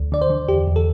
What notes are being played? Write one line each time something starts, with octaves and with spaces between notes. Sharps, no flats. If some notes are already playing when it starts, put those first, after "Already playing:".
Already playing: D2
D3 D5
C5
D3
E2 G4
E2
A4